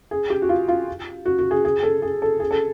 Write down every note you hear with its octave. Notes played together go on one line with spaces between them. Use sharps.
G#4
G4
F#4
F4
F4
F#4
F#4
G#4
G#4
A4
G#4
A4
G#4
A4